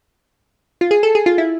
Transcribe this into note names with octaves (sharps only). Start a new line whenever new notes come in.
F4
G#4
A4
G#4
F4
E4